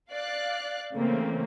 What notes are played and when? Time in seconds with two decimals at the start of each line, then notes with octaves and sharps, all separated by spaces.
0.12 D5 F5 F#6
0.94 C#3 E3 A3 A#3 C4